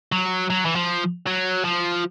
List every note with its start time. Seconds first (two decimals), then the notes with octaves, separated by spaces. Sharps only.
0.12 F#3
0.50 F#3
0.65 E3
0.76 F3
1.27 F#3
1.65 F3